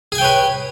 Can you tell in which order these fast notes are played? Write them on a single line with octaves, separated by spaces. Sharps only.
G#4 G#5 G5 C#5 B4